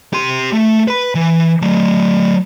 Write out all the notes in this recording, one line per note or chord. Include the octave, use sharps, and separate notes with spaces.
G4 C6
A3
B4 B5
E3
F#3 A3